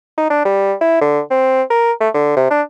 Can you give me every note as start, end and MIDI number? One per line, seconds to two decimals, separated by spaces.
0.18 0.29 63
0.30 0.41 62
0.45 0.74 55
0.81 1.01 64
1.01 1.20 50
1.31 1.63 60
1.70 1.92 70
2.01 2.09 57
2.14 2.32 50
2.37 2.48 48
2.51 2.62 62